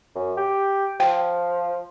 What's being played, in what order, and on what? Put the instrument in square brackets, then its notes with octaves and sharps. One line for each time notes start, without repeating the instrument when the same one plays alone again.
[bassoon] F#2
G4
[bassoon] F3 [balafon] G5